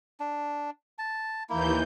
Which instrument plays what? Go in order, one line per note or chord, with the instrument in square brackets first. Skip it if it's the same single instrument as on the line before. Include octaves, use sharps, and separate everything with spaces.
[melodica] D4
A5
[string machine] D#2 E3 G6 [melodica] A#3 E4